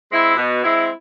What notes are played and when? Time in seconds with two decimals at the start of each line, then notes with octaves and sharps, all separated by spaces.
0.11 G#3 C4 E4
0.37 B2
0.64 G#3 C4 E4